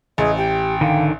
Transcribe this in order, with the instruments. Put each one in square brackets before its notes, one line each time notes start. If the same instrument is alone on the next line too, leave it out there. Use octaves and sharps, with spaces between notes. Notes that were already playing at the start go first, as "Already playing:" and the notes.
[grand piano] A1 [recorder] G#4 [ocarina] D#5
[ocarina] G4 [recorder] G5
[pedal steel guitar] D3 D#3 [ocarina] F5